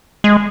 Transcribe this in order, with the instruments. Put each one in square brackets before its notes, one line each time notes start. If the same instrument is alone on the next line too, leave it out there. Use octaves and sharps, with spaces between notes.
[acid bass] G#3